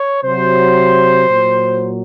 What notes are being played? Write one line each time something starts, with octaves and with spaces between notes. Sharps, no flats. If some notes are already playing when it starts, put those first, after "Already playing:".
Already playing: C#5
C3 F#3 C5
A#2 F#3